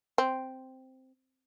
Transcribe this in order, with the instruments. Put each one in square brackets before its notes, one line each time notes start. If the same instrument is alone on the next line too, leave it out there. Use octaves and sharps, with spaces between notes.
[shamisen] C4